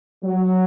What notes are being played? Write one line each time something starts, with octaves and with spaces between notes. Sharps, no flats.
F#3